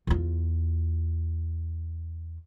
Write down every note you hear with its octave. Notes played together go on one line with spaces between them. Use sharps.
E2 F4